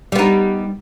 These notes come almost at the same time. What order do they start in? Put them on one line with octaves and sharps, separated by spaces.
G3 B3 D#4